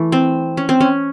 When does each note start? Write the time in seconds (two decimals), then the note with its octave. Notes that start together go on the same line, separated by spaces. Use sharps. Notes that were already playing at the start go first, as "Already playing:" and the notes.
Already playing: E3 A3
0.12 C4
0.57 C#4
0.69 C4
0.80 C#4